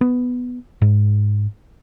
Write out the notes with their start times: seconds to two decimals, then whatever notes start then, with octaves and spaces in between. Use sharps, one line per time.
0.01 B3
0.82 G#2